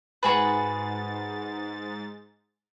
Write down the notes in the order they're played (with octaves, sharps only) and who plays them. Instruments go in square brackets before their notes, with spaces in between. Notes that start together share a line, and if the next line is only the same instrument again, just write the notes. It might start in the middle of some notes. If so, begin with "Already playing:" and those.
[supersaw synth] G#2 A6 [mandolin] F#4 G#4 B4